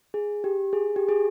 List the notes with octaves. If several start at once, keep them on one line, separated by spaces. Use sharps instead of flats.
G#4
G4
G#4
G4
G#4